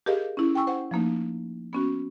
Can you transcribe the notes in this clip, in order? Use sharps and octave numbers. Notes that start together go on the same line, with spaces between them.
G4 G#4 A#4 D#5 F5
C#4 E4
G5 G#5 C#6 E6
C5 F#5
F3 A3 A#3 D#4
B3 C#4 F#4